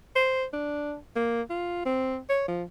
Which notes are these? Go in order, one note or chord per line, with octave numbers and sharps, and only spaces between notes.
C5
D4
A#3
F4
C4
C#5
F3